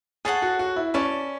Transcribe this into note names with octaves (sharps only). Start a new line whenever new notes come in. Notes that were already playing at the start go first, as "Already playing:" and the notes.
G#4 A4 C#5 F#5 A5
F#4
F#4
E4
C#4 B4 D5 A5 D6